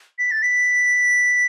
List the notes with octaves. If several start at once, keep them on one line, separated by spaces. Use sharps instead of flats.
B6
A6
B6